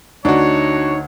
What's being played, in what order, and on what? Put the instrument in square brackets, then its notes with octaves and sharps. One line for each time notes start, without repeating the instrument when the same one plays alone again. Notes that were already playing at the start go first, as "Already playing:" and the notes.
[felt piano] D2 D5 G#6 [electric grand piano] D4 F#4 [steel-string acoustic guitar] D#4 [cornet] C#5